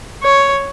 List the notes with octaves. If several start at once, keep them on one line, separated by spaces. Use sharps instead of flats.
C#5